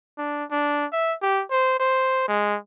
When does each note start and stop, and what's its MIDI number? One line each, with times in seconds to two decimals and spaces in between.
0.18 0.44 62
0.51 0.86 62
0.93 1.14 76
1.22 1.43 67
1.51 1.79 72
1.80 2.27 72
2.28 2.57 56